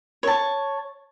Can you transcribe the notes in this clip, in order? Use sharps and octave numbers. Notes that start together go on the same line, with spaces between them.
C#5 A5